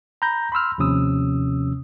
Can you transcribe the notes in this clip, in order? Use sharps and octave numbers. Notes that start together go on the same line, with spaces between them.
A#5 B5 G6 A#6
B5 C6 E6 F6
D#2 C3 F3 C#4 D#6 E6